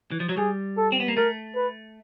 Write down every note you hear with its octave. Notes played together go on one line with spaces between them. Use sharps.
E3
F3
F#3
G3 G#4
A4
C4
B3
A#3
A3 A#4
B4